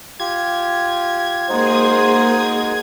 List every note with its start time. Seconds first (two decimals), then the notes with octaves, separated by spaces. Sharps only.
0.20 F4 G4 G#6
1.49 G#3 A#3 D#4 F#4 G#4 C5 D#6